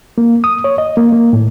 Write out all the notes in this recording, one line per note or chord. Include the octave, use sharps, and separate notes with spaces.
A#3
D#6
C#5
D#5
A#3
A#3
A2